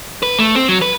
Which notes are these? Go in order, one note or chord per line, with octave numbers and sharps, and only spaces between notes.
B4
A3
C4
F#3
B4